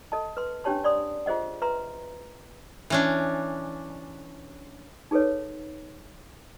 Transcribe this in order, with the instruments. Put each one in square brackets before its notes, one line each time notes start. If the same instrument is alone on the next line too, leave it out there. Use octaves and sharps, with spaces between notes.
[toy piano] A4 D#5 A5
B4 C6
C#4 D4 G4 C#5 A5 C6
D5 C6 D#6
F4 G#4 C5 D#5 F#5
B4 E5 A#5 C6
[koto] E3 C#4 D4
[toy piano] D#4 G#4 A4 B4 C#5